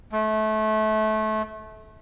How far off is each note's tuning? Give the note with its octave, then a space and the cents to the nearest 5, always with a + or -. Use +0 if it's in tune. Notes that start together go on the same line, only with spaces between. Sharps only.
A3 -25